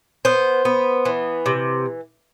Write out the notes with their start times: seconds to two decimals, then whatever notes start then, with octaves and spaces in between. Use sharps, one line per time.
0.25 B3 C5
0.65 B3
1.05 E3
1.46 C3